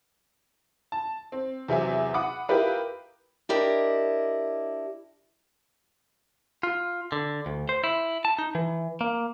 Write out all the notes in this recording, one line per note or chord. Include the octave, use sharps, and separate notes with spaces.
A5
C4
E2 C3 F#3 E5 G#5
F#5 B5 D6 D#6
E4 F4 G4 A#4 B4 F5
D4 E4 G4 A#4 D#5
F4
D3
D2
C5
E4
A5
D#4
E3
A#3